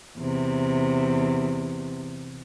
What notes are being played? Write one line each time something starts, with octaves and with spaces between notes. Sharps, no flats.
E2 C3